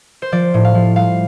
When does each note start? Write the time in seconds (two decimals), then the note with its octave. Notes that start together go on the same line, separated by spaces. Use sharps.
0.22 C5
0.32 F3 D5
0.54 A2
0.65 F5
0.75 F3
0.96 G3 F5